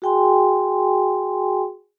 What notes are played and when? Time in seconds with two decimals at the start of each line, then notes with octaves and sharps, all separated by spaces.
0.02 F#4 G#4 G5 G#5 C6